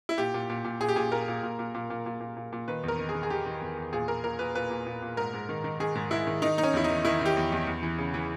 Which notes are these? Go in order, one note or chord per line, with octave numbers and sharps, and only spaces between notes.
E4
A#2 G4
A#2
A#2
A#2
A#2 G#4
G4
A#2 G#4
A#2 A#4
A#2
A#2
A#2
A#2
A#2
A#2
A#2
A#2
A#2
D#3 B4
E2 A#4
D#3
G#4
D#3
G#4
D#3 G4
D#3
E2
E2
A#2 G#4
A#2 A#4
A#2 A#4
A#2 B4
A#2 B4
A#2
A#2
A#2
G#2 A#4
G#2
D#3
D#3
D#3 G#4
G#2
G#2 E4
D#3
D#3 D#4
D#3 D#4
C#4
E2 E4
D#4
D#3
D#3 E4
D#3 G4
E2
E2
E2
E3
C#3
E3